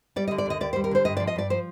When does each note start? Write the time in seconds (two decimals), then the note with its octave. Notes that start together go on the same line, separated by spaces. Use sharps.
0.16 G3 D5
0.27 D#5
0.31 D3
0.38 D5
0.46 D#2 D#5
0.61 D#2 D5
0.73 C5
0.76 G3
0.84 A#4
0.91 D3 C5
1.05 G2 D#5
1.17 D5
1.20 F3
1.27 D#5
1.36 G2 D5
1.50 F3 C5